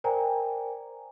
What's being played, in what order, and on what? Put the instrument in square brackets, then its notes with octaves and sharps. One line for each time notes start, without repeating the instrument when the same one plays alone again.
[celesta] A#4 C5 D5 G5 G#5 A#5